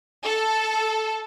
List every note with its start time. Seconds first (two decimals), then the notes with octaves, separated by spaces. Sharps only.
0.24 A4